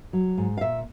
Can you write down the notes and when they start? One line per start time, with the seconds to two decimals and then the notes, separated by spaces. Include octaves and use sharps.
0.13 F#3
0.37 G#2
0.57 F5
0.61 A#2 E5